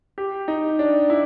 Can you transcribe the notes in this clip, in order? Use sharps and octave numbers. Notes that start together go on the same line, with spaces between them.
G4
D#4
D4
E4